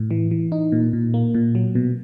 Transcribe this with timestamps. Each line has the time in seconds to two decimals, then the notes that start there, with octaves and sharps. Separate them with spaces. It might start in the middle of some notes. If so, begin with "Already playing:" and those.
Already playing: A2
0.11 E3
0.31 E3
0.52 D#4
0.72 A#2
0.93 A#2
1.14 A#3
1.34 A#2
1.55 F#3
1.75 B2